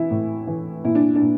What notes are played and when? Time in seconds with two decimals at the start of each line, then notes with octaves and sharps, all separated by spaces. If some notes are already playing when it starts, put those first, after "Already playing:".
Already playing: E3 E4 E5
0.11 A2
0.47 E3
0.84 A#2 E4
0.95 D4
1.15 D4
1.21 A#2